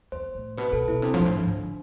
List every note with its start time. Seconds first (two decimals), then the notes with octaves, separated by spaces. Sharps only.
0.12 E2 C5
0.35 A2
0.58 B2 B4
0.72 B2 A4
0.88 B2 E4
1.02 C3 D4
1.14 F3
1.20 G#2
1.25 A2
1.37 G#2
1.48 D3